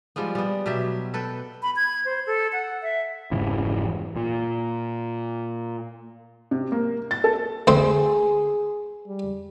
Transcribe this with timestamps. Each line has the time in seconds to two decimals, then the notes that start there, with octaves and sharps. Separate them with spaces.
0.16 F3 G3 G#3 B3
0.35 G3 B3
0.66 B2 F#3 G4 E5
1.14 A4 B4 G5
1.62 B5
1.76 G#6
2.05 C5
2.27 A4
2.53 F#5
2.82 E5
3.31 F1 G#2 C#3 E3
4.16 A#2
6.51 C3
6.72 A#3
7.11 A6
7.24 A4
7.67 D2 C4 G#4 C5
9.07 G3